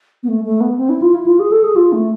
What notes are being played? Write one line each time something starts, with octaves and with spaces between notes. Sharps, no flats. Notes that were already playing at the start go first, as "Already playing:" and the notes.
B3
A3
A3
B3
C4
E4
F4
E4
F4
G#4
A4
G#4
F4
A3